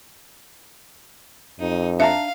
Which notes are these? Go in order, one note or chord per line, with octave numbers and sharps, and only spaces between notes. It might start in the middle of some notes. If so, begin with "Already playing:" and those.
F2 D#4
D4 E5 F5 A5 A#5